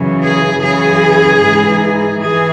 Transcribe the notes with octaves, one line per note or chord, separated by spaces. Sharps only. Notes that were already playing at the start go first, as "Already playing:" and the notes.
Already playing: F#2 C#3 E3
G#4
F#2 C#3 E3 G#4
G#2 E3
E3 G#4